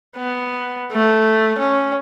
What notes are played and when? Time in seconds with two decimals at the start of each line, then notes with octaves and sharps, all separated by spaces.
0.16 B3
0.92 A3
1.58 C#4